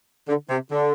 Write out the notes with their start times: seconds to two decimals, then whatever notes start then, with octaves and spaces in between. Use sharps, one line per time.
0.29 D3
0.50 C3
0.71 D3